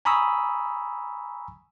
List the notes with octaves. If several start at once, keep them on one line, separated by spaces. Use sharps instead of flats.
G#5 A#5 B5 C#6 D#6 E6